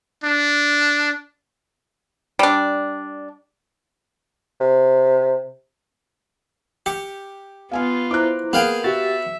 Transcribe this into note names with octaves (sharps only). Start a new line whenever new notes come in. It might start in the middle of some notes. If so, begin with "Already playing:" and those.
D4
G3 D4
C3
G4 C#7
B3 F4 F5 G#5 F6
E4 C5 A#5 D6 F#6
A#3 B3 G#4 F5 G5
F#4 G4 E5 A6